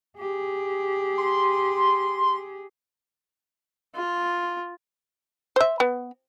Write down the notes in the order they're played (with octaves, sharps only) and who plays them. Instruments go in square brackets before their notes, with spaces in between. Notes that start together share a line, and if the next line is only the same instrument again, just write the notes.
[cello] G4 G#4
[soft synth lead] C6
[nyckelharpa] F4
[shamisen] C5 E5
B3